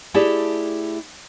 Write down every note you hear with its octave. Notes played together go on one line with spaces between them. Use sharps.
A3 E4 G4 G#4 D5 A5